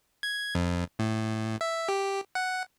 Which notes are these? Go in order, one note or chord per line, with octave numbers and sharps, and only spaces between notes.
G#6
F2
A2
E5
G4
F#5